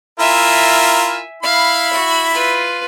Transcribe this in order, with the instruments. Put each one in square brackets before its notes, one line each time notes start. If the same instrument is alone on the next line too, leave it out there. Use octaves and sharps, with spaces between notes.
[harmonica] E4 F4 A#4 [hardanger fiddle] E5 G#5
[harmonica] E4 B5 [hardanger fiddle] F5
[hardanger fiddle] F#4
F4 B4